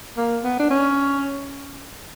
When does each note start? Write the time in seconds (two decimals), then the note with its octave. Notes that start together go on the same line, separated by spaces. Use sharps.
0.17 A#3
0.44 B3
0.60 D4
0.70 C#4